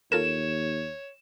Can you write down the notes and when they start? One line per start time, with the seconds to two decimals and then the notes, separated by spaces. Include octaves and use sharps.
0.12 D#2 F4 A4 A#4 C#5 E7